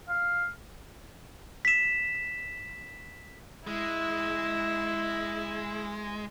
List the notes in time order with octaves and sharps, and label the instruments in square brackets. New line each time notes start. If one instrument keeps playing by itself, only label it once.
[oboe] F5
[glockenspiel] B6 E7
[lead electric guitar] G#3 [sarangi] E4